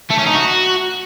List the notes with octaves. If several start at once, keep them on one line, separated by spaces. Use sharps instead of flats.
A3
C#4
D#4
F#4